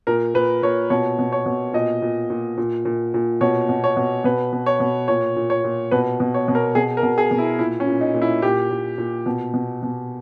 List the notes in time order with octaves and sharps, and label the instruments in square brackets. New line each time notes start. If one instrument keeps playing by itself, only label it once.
[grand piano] A#2 A#4
A#2 B4
A#2 C#5
B2 C#5
B2
C#5
B2
A#2 D#5
A#2
A#2
A#2
A#2
A#2
B2 C#5
B2
C#5
B2
B2 B4
B2
C#5
B2
A#2 C#5
A#2
C#5
A#2
B2 B4
B2
C#5
B2
A#4
B2 G#4
A#4
B2
G#4
B2
E4
A#2 E4
C#4
A#2
D#4
A#2
E4
A#2 G4
A#2
A#2
B2
B2
B2